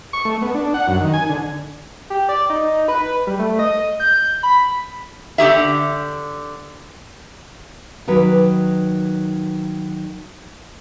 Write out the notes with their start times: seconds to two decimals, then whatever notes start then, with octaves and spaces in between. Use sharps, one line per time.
0.13 C#6
0.25 A3
0.42 B3
0.55 D4
0.74 F#5
0.88 F#2
1.01 D#3
1.14 G#5
1.29 D3
2.10 G4
2.29 D5
2.50 D#4
2.88 B4
3.27 G3
3.39 A3
3.59 D#5
4.00 G6
4.43 B5
5.38 D3 G4 G#4 E5
8.08 D#3 F#3 B4